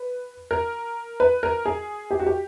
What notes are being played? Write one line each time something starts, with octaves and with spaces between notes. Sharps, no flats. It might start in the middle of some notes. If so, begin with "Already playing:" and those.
Already playing: B4
A#4
B4
A#4
G#4
G4
F#4
G4